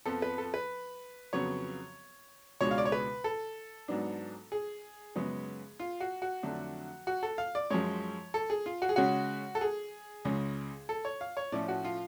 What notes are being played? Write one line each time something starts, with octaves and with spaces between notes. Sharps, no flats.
F2 F3 B3 A4
B4
A4
B4
F2 C#3 F#3 B3 C#5
C#2 B2 G#3 D4 C#5
F5
D5
C#5
B4
A4
G#2 F#3 B3 D4
G#4
F#2 C#3 G#3 B3
F4
F#4
F#4
F2 D3 F#3 A3 D4
F#4
A4
F5
D5
F#2 F3 G#3 C#5
A4
G#4
F4
F#4
G#4
C#3 G#3 C#4 F#4
A4
G#4
C#2 C#3 G#3
A4
C#5
F5
C#5
A2 F3 A3 C#4 D5
F#4
F4